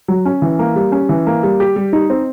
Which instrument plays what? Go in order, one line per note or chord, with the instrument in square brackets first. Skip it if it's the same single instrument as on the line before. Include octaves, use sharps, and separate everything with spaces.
[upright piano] F#3
C#4
E3
A#3
G3
C#4
E3
A#3
G3
G4
G3
D#4
C4